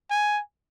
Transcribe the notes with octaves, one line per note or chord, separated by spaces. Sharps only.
G#5